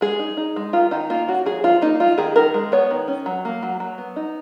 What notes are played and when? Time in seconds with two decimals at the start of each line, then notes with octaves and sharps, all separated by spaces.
0.01 G#3 G#4
0.19 D#4
0.37 D#4
0.56 G#3
0.73 D#3 F4
0.91 D#3 D#4
1.10 A#3 F4
1.28 C#4 F#4
1.46 F3 G#4
1.64 F3 F4
1.82 A#3 D#4
2.00 D#4 F4
2.18 D#3 G#4
2.36 D#3 A#4
2.54 G#3
2.72 B3 C#5
2.91 D#3
3.08 C#4
3.26 F#3
3.45 A#3
3.63 F#3
3.80 F#3
3.98 B3
4.16 D#4